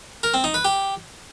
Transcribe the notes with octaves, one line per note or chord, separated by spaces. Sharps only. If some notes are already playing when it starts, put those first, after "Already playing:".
A#4
C4
D#4
B4
G4